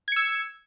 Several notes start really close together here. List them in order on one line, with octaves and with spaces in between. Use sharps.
G#6 C#7 E6